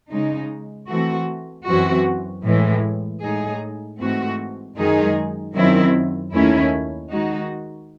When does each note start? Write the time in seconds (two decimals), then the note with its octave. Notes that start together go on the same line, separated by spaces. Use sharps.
0.11 C#3 G#3 D#4
0.89 E3 A3 C4 F#4
1.67 F#2 E3 C4 F#4
2.44 A2 E3 G#3
3.22 A2 G#3 D#4 G#4
4.00 G#2 E3 A3 C4 F#4
4.76 F#2 D#3 G#3 D#4 G#4
5.55 F#2 D#3 F#3 C4 E4
6.32 D#2 D#3 A3 C#4 E4
7.10 D#3 G#3 D#4 F#4